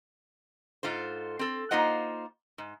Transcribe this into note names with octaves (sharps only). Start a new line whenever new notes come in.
G#2 F4 A4 C5
C4 A4
A#3 D#4 F4 C5 D#5 F#5
G#2